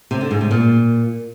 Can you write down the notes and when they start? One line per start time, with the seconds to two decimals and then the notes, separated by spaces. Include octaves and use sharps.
0.11 C3
0.21 D3
0.31 G#2
0.41 C3
0.51 A#2